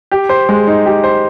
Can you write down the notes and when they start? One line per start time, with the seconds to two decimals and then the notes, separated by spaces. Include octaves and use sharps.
0.11 G4
0.29 C5
0.49 G#3
0.67 D#4
0.86 G4
1.04 C5